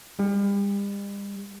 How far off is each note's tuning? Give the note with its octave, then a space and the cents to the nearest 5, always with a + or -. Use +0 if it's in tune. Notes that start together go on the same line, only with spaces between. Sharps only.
G3 +40